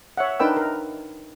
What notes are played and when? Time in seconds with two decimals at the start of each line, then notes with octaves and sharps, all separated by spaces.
0.18 C#5 E5 F#5
0.40 D4 D#4 A#4 B4 G5 E6
0.57 A#4